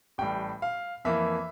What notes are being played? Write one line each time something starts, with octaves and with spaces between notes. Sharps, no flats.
A1 A2 G3 G5
F5
F2 E3 A#3 E5